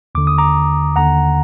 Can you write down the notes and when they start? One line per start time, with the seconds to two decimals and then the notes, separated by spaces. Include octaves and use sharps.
0.15 D#2 D3 D6
0.27 D#6
0.38 A#5 D6
0.96 D#2 D3 F#5 A#5